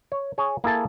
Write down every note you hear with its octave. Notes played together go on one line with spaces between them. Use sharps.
C#5
G#4 C#5
A#3 E4 G#4 A4 A5